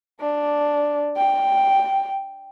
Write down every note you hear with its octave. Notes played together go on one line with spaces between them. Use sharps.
D4
G5